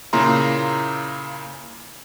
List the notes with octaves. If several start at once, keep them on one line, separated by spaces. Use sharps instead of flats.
A#2 C#3 A#3 E4 A#5 C6